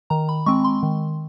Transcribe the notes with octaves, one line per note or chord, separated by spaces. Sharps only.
D#3 A#5
B5
G#3 C4 C#6
C6
D#3